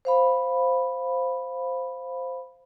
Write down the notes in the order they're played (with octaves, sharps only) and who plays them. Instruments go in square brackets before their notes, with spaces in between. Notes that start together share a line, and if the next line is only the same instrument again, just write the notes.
[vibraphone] C5 F5 B5